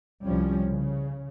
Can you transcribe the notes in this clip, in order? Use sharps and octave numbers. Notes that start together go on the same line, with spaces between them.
C2 F3 G3 C#4
C#3